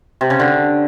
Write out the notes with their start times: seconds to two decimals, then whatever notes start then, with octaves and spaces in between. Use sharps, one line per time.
0.21 C3
0.30 C#3
0.40 D3